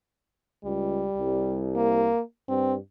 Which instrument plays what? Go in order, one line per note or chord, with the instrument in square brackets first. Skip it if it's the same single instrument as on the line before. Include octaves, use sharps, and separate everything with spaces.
[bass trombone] C#2 [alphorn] G3
[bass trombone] C2
[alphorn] A#3
[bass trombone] G2 [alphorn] C4